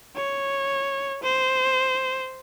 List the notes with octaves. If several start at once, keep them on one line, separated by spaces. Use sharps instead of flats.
C#5
C5